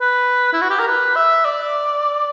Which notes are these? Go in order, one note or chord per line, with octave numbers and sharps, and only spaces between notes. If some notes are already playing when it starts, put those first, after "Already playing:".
B4
E4
F#4
G4
A#4
B4
E5
D5